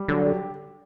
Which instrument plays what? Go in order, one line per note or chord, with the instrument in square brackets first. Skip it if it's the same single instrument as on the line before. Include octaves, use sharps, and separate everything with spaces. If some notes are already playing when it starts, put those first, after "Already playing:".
Already playing: [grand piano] G3
[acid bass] D3 [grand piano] F#3
[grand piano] G4